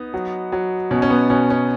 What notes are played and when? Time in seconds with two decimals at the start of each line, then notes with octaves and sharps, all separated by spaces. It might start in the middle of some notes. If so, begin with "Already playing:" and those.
Already playing: B3 D#4
0.14 F#3
0.52 F#3
0.91 B2 C#4
1.02 C#4
1.10 B3
1.30 B2 C#4
1.50 C#4